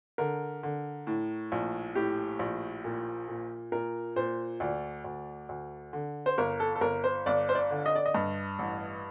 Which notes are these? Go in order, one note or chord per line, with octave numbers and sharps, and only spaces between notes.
D3 A#4
D3
A2
A#1
A2 G4
A#1
A#2
A#2
A#2 A#4
A#2 C5
D2 D5
D2
D2
D3
C5
G1 A#4
A4
A4
G1 A#4
C5
G1 D5
C5
D5
D3
D#5
D5
D#5
G2
A1